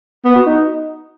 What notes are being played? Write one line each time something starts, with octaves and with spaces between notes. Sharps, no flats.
B3
F#4
D#4